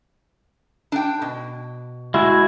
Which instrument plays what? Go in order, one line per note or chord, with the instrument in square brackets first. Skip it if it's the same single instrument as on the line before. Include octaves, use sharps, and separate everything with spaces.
[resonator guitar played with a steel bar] D4 G5
B2
[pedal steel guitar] G#3 F#4 G#5 [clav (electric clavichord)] E4